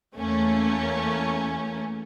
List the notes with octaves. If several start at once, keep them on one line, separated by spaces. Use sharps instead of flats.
E2 A3 A#3 C#4